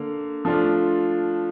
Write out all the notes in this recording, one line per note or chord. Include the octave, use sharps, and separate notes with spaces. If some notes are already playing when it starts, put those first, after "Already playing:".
Already playing: D3 A#3
F3 A3 D4 F4